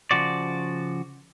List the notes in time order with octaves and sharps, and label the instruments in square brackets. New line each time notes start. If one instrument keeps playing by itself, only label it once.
[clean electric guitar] C#3 F3 F#4 D5